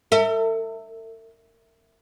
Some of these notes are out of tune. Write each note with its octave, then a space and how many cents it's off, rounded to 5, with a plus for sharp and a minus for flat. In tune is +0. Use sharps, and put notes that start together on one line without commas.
A4 +45 E5 -5